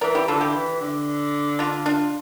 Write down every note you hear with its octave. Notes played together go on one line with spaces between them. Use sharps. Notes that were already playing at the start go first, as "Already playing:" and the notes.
E3 A#4 D5
E4 G4
D3 F4 A4
E4 G4
E3
D3
D4 F4
D4 F4